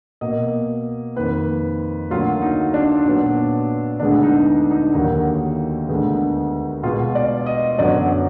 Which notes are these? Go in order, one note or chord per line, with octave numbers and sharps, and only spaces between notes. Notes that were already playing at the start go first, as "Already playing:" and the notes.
B2 A#3 D#5
F2 D#3 A#3 B4
D2 D3 F#3 A#3 F4
D#4
D4
A#2 F#3 B3
D2 D3 G#3 B3 D4
D#4
D#4
D#2 D3 F#3 A#3 D#4
D2 D3 G#3 B3
B2 G#3 B3 F4
D5
D#5
F#2 D3 F#3 B3 D5